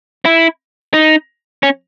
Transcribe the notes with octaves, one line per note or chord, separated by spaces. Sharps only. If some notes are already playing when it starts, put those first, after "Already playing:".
E4
D#4
C#4